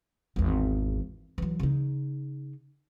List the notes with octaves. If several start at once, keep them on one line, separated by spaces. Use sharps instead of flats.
G#1 E2
E3 F#3
C#3 D#4